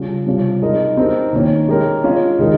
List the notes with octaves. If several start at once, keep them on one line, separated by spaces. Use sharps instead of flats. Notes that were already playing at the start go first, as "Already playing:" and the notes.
Already playing: C#3 G3 C#4 F4
C3 G3 C#4 F4
G#3 D#4 A#4 D#5
C4 D#4 G4 A#4
D#3 A#3 C#4
G#3 C#4 G4 A#4
G#3 C#4 F4
D#3 G#3 D#4 A#4